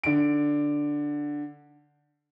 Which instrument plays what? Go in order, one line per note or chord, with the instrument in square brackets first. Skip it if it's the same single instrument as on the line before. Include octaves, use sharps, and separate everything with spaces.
[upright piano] D3 D7